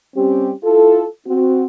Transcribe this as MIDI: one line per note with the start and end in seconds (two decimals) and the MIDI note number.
0.16 0.52 55
0.16 0.52 60
0.16 0.52 61
0.16 0.52 67
0.64 1.05 64
0.64 1.05 65
0.64 1.05 69
1.28 1.66 60
1.28 1.66 66